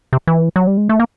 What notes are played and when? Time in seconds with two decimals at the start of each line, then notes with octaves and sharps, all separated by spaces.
0.13 C3
0.27 E3
0.56 F#3
0.67 G3
0.77 G#3
0.89 A3
1.00 A#3